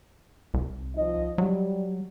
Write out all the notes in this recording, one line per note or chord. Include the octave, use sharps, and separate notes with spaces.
C2
F3 D#4 D#5
F#3 G3